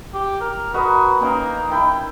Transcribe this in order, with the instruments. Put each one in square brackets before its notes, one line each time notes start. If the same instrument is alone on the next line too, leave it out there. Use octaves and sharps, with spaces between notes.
[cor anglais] G4
A#4
[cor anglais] F#4 [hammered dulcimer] A#4 B4 D#5
[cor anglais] A#3 [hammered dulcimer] C#4 D#4 G5
[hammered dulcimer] D#3 E4 [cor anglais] G5